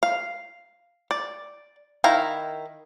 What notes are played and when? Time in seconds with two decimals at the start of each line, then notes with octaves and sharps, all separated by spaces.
0.03 F5
1.11 D5
2.04 D#3 E4 F5 A#5